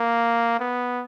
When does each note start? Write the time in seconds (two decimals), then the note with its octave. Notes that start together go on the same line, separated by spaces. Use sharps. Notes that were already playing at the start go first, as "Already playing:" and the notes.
Already playing: A#3
0.60 B3